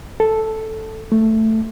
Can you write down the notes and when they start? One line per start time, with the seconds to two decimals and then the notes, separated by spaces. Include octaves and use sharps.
0.20 A4
1.12 A3